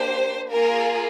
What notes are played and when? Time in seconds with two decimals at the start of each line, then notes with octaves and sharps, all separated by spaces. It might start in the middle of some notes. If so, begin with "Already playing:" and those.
Already playing: A#3 D4 G4 C5
0.52 A#3 F4 G#4 A#4